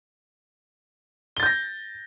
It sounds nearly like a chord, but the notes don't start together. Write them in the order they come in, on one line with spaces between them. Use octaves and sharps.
G7 A6 G6 A#6